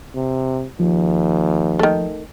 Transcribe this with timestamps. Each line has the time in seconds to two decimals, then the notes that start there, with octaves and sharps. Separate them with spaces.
0.15 C3
0.80 D#2 F3
1.79 D#3 A3